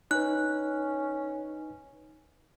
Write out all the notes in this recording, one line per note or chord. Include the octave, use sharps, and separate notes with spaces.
C#4 D#4 B4 F#6